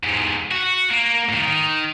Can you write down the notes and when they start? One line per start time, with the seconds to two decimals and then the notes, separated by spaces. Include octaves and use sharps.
0.04 E2 G#2
0.51 F#4
0.90 A#3
1.29 A2 D#3
1.42 D#3